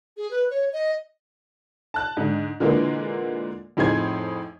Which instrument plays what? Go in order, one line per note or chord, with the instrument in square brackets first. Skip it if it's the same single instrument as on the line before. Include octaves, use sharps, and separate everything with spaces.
[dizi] G#4
B4
C#5
D#5
[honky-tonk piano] A5 F#6
G#2 D3
A#2 D3 E3 G#3 A#3
F2 A2 D#4 G#4 C5 G#6